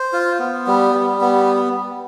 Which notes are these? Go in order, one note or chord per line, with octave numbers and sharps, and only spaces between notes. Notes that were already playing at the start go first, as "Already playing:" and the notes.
Already playing: C5
F4
B3
G3
G3
B3